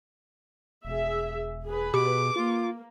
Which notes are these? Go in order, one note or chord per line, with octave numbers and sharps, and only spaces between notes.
E1 G#4 E5
G#4 B4
B2 G4 D6
A#3 F4